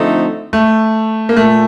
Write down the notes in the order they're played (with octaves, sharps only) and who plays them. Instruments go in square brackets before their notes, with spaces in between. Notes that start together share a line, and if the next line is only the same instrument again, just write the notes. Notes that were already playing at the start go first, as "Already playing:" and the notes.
Already playing: [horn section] D3 F3 A3 C4 D#4
[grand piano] A3
A#3
[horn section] A#2 [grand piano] A3